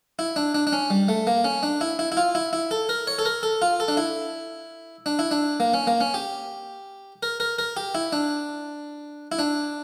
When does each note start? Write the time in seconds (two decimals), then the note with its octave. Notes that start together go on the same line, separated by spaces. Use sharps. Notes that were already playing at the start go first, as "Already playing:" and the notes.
0.19 E4
0.36 D4
0.55 D4
0.67 D4
0.73 C#4
0.90 G3
1.08 A3
1.27 A#3
1.44 C#4
1.63 D4
1.81 E4
1.99 E4
2.12 E4
2.17 F4
2.35 E4
2.53 E4
2.71 A4
2.89 A#4
3.07 C#5
3.19 A4
3.25 A#4
3.43 A4
3.62 F4
3.80 A4
3.88 D4
3.97 E4
5.06 D4
5.19 E4
5.31 D4
5.60 A#3
5.74 C#4
5.87 A#3
6.01 C#4
6.14 G4
7.23 A#4
7.40 A#4
7.59 A#4
7.77 G4
7.95 E4
8.13 D4
9.32 E4
9.39 D4